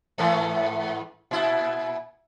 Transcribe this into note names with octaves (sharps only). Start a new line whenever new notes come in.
G#2 E3 A3
A#2 E4